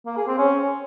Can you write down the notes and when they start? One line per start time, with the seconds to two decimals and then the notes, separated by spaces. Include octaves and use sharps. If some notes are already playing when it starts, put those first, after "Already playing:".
0.06 A#3
0.17 G#4
0.27 C4
0.38 C#4